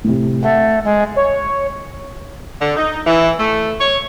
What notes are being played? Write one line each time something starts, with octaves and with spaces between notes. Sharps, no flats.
A2 C3
A3 F#5
G#3
C#5
D3
D#4
E3
A3
C#5